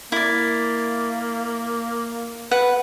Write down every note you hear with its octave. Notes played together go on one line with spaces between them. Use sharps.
A#3 E4 D5
B4 F#5